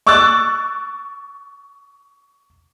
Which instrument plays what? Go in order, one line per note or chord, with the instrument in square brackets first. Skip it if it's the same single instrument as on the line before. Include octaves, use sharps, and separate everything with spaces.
[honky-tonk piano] C#6 D6 E6 F#6 A6